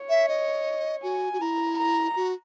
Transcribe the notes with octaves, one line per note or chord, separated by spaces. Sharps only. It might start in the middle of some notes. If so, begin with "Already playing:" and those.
Already playing: C#5
E5
D#5
F#4 G#5
F#4
E4 A#5
A#5
F#4